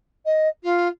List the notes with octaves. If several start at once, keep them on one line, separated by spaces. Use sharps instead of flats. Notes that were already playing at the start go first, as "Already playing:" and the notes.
D#5
F4